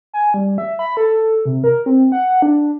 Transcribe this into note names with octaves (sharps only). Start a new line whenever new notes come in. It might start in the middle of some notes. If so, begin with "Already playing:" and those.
G#5
G3
E5
B5
A4
A4
C3
A#4
C4
F#5
D4